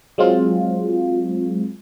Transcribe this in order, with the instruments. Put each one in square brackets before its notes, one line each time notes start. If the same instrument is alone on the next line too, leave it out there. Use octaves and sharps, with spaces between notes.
[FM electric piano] F#3 G#3 C4 F4